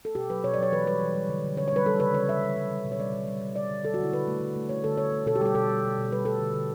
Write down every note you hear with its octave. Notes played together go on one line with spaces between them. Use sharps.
A4
B2 G4
F#3 B4
B2 C#5
D5
F#3 C#5
E3 B4
G3 B4
E3
G3
D3
D3
D3 C#5
C#5
G3 B4
G3 A4
C#3 B4
C#3 C#5
C#3 E5
G3
G3
G3
B2
C#5
G3 D5
G3
G3
G3
G3 D5
D3
D3 A4
F#4
D3 E4
D3 B4
A3
D3
A3
A3 C#5
D3 A4
D3 C#5
A3
B2 A4
G4
G3 A4
G4
B2 A4
G3
B2
B2
G3 B4
G3 A4
D3
D3